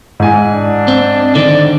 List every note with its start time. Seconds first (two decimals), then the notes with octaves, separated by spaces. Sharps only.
0.20 G#2 E4 G#5
0.52 D4
0.88 C4
1.35 D3 D#3 C4 D5